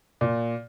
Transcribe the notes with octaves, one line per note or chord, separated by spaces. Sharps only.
A#2